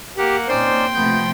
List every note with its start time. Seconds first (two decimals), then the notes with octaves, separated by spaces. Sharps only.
0.18 A#3 G4 F#5
0.48 A#2 C4 C#4 D#4 C5 D5 G5 C6
0.95 C3 F3 A3 B3 G6